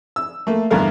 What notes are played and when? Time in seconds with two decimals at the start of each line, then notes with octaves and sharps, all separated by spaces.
0.16 E6
0.47 A3 A#3
0.70 E2 G2 B2 D3 A#4 F5